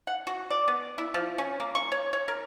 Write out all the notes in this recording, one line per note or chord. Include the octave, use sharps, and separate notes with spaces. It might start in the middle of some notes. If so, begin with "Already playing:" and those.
F#5
F#4
D5
B3
E4
F3
C#4
A#3
C#6
C#5
C#5
A#4